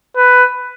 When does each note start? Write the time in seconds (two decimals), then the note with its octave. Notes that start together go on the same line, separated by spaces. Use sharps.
0.16 B4